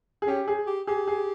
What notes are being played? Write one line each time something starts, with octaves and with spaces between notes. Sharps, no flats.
G#4
C#4 G4
G#4
G4
G4 G#4
G#4